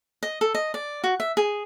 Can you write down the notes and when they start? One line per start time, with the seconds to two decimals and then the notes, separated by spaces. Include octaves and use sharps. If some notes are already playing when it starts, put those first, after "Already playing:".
0.23 D#5
0.41 A4
0.55 D#5
0.74 D5
1.04 F#4
1.20 E5
1.37 G#4